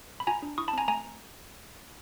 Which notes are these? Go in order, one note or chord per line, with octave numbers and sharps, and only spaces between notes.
B5
F4 G#5 A#5
D4
E4 C#6 D#6
A5 B5
C4 G#5 A#5
A3 G#5 A#5